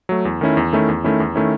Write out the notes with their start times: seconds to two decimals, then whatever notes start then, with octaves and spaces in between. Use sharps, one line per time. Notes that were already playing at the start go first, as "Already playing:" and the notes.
0.09 F#3 A3
0.25 E2
0.41 D#3 A3 C#4 E4
0.57 E2
0.73 D#3 A3 C#4 E4
0.89 E2
1.04 D#3 A3 C#4 E4
1.20 E2
1.35 D#3 A3 C#4 E4